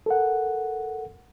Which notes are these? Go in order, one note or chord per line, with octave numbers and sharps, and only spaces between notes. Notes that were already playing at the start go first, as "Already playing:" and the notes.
A4 A#4 F#5